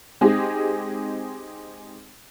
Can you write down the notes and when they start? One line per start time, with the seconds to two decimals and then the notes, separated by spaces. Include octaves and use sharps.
0.21 G#3 C4 D#4 G4 G#4